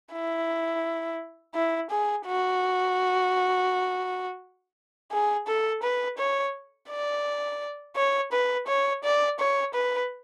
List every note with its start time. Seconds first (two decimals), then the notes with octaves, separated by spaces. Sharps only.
0.13 E4
1.55 E4
1.90 G#4
2.27 F#4
5.12 G#4
5.47 A4
5.83 B4
6.18 C#5
6.90 D5
7.96 C#5
8.32 B4
8.67 C#5
9.04 D5
9.39 C#5
9.74 B4